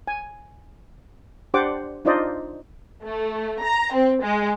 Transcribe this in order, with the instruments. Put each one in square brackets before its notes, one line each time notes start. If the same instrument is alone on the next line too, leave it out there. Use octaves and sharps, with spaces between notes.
[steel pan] G#5
D4 G4 C5 D5 F#5 D6
D4 D#4 F4 C5 D5 D#5
[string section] A3
A#5
C4
G#3